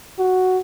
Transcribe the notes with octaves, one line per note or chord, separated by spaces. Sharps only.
F#4